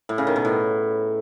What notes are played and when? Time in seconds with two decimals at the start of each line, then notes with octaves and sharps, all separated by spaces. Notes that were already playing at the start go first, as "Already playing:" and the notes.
0.09 A2
0.18 C#3
0.27 D#3
0.36 B2
0.45 A2